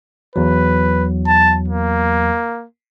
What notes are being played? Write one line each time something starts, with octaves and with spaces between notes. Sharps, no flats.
E2 F#3 B4
A5
A#3